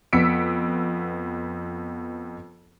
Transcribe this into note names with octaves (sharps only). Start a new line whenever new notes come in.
F2 B3 E6 B6 C#7 D7